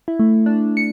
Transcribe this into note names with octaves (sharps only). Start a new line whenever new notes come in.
E4
A3
D4
C#7